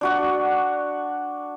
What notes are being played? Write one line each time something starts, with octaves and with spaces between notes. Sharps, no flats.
D4 F#4 F#5